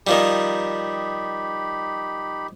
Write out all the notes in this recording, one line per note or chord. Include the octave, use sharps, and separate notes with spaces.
D#3 F3 G3 D#4 G4 B5